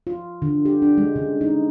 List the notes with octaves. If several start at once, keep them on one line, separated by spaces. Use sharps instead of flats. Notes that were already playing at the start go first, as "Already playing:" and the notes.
F4
D3
G4
D4
G#3
C#3
D#4